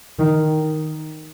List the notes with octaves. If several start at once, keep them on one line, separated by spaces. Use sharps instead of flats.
D#3